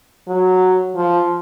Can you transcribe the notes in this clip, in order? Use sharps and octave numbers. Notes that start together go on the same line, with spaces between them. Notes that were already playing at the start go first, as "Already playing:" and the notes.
F#3
F3